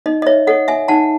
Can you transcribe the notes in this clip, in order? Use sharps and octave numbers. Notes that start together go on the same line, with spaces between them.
D#4 D#5
D#5
C#5 E5
A4 C#5 D#5 F#5
E5 G#5
D#4 F#5 A5